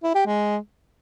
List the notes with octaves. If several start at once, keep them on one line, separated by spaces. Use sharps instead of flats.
E4
G4
G#3